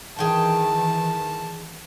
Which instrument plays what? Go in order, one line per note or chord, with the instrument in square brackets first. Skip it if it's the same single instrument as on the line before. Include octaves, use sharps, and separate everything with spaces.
[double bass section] D#3 E3 [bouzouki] G#4 G5 [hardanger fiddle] A5